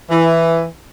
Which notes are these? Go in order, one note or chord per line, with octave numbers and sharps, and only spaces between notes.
E3